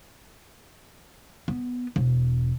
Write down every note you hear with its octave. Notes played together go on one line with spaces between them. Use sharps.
B3
E1